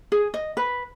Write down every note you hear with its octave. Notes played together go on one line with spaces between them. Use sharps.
G#4
D#5
B4